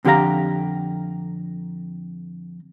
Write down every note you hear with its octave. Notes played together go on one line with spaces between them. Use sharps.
F2 D3 G4 G#4 F5 A#5